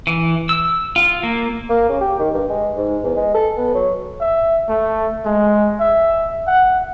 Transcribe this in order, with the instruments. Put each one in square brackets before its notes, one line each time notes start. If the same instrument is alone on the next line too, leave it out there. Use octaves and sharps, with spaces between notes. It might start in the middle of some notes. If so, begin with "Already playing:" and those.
[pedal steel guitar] E3
E6
F4
A#3
[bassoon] A#3
C#3
G4
D#3
G2
G#3
G#2
E2
G#3
A4
B3
F#3
[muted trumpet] E5
A3
G#3
E5
F#5